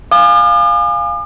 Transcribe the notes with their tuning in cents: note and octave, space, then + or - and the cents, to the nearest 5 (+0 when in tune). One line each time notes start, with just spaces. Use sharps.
F5 +5 G#5 -10 D6 +45